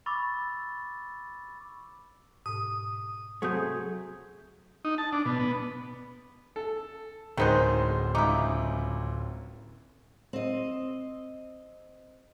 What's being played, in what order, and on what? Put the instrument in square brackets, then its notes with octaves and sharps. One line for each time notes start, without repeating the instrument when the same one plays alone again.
[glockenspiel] B5 C#6 D6 E6 A6
[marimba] G#2 B2 [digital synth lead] D#6
[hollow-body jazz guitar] C3 F#3 A3 [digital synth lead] G#4 [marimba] C#6 D#6 G6
[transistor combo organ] D#4
A5
D4
B2
B3
[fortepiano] A4
[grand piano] D1 C5 G6 [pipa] D#3 B3 D4 [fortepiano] G#3 D#4
[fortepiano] C#2 D6 [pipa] D#4 E4
[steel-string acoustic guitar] C4 D#5